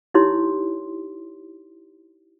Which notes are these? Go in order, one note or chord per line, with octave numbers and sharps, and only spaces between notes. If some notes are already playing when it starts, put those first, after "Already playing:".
D#4 E4 G4 C#5 C6